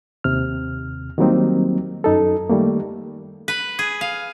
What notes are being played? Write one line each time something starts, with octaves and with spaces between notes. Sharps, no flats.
D#2 C3 F6
D#3 F#3 G3 A#3 C4 D#4
F#2 D#4 A4
D#3 G3 A3 A#3
B4
G#4
F5